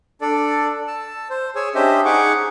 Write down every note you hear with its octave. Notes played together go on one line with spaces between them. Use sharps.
D4 A4 D5
A5 E6
C5
G#4 C#5 G#5 E6
C#4 D4 G4 C5 D#5 E5
D#4 G#4 F#5 C#6 D6